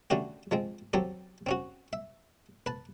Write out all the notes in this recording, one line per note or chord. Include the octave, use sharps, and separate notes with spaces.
D3 A3 C#4 F#4 G4
F3 G#3 C4
F#3 C4 G4 A4
C4 C#4 F#4
E5
B4 A5